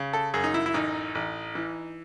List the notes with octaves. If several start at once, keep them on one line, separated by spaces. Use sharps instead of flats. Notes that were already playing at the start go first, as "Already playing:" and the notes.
Already playing: C#3
A4
F#2 G#4
D#4
E4
E4
A1 D#4
A1
E3